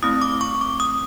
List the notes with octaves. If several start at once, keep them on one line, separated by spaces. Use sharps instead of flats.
A3 C4 E4 D#6
D6
C#6
D6
D#6